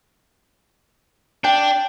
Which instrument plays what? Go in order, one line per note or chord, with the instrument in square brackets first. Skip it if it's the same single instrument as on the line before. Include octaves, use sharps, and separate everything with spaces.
[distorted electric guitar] D4 [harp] G5